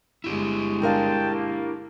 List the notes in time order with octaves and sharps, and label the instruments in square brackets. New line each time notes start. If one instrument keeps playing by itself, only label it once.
[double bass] G1 G#3 [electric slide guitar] E4 G4
[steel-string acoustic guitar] D4 A#4 F5 [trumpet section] G5 A5
[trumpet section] A#3